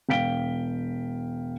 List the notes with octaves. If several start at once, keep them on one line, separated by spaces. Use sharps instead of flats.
E1 F5 G5 B6 D7 G7